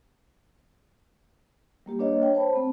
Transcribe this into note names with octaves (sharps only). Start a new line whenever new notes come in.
G3 A#3 G4
A#3 D4 B4 C#5 D#5 F5
C#5 G5
C5 A5 B5
A3 C4